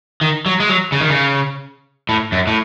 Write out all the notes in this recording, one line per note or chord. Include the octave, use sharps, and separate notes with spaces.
D#3
F#3
G#3
F#3
C#3
D#3
C#3
A2
F#2
A2